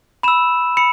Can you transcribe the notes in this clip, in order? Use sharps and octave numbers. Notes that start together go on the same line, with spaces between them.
B5 E6 E7
B5 C#7